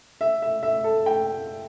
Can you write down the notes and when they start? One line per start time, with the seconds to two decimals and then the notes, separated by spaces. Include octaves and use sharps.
0.21 E5
0.42 E5
0.63 E5
0.84 A4
1.06 G5